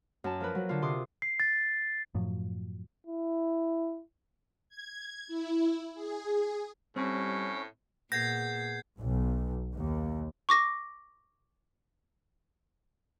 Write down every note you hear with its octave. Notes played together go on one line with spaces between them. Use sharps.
F#2 A5
F3 A#4 B4
F#3
D3 F4
C3 C6 D6 D#6
C7
A6
F#2 A2 F3 F#3
E4
G#6
E4
G#4
A2 G3 C4 C#4
A#2 B3 G#4 G6 G#6 A#6 C7
B1
D#2
C#6 D6 A#6